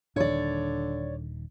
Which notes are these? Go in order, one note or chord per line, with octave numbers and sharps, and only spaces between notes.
D#1 D3 D#3 C#5 D5